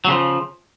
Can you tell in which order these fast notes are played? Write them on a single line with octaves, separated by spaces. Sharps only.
F#3 C#3 F3